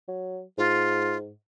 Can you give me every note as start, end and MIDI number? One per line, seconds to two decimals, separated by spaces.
0.08 0.42 54
0.58 1.31 44
0.58 1.17 65